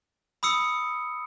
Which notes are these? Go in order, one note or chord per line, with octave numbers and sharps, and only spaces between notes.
B5 D#6 E6 C#7